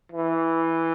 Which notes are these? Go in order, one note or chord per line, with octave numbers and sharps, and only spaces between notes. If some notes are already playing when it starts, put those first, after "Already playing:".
E3